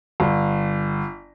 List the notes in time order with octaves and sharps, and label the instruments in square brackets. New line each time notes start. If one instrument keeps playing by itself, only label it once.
[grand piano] G1